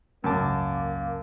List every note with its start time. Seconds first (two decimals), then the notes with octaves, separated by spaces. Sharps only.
0.24 G#1 C#2 F#2 A#3 A5 D6